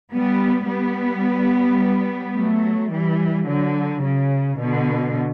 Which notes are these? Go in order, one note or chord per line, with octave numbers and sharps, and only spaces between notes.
G3 B3
G3 B3
F#3 A3
E3 G3
D3 F#3
C#3
B2 D3